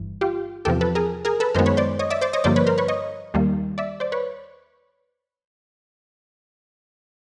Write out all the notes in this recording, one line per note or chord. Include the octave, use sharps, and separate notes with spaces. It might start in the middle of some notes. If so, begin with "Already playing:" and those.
Already playing: G1 G2 E3
F4 G4
E2 C3 F3 G4 A4
A4 B4
G#4 A#4
G#4 A#4
A4 B4
F#2 D#3 G#3 B3 A#4 C5
B4 C#5
C5 D5
C#5 D#5
D5 E5
C5 D5
C#5 D#5
G2 D3 F3 A#3 C5 D5
B4 C#5
A#4 C5
B4 C#5
C#5 D#5
D#2 D#3 G3 A#3
D5 E5
C5 D5
B4 C#5